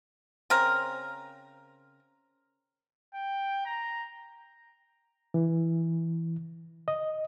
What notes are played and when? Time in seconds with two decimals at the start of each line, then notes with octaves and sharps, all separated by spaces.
0.50 C#3 C4 A#4
3.15 G5
3.66 A#5
5.34 E3
6.88 D#5